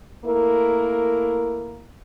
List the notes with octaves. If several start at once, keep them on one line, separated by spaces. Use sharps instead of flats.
A3 A#3 E4 A#4